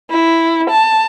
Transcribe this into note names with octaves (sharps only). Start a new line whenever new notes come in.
E4
A5